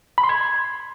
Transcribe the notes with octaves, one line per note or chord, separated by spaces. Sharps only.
B5
C6
G#6